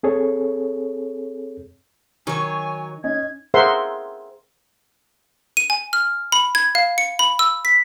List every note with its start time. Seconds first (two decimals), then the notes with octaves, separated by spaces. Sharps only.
0.03 C4 G#4 A4 C#5
2.27 D#3 F#3 C#5 G#5
3.04 C#4 D#4 G#6
3.54 G#4 A#4 C5 E5 F#5 C6
5.57 D#7
5.70 G#5
5.93 F6
6.32 B5
6.55 G#6
6.75 F5
6.98 C#7
7.19 B5
7.39 E6
7.65 B6